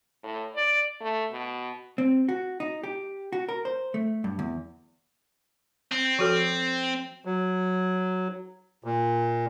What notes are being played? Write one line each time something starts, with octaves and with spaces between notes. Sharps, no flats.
A2
D5
A3
B2
C4
F#4
D#4
G4
F#4
A#4
C5
A3
G2
E2
C4
F3 F#4 A4
F#3
A#2